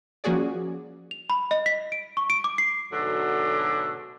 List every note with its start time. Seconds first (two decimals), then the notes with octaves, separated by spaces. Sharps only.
0.24 F3 A#3 C#4 F#4 G#4 D5
1.11 F7
1.30 B5
1.51 D#5
1.66 B6
1.92 D7
2.17 C#6
2.30 D7
2.44 D6
2.58 C7
2.92 G#2 B2 D3 F#3 A3